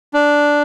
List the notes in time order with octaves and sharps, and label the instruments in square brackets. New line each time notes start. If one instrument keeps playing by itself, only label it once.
[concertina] D4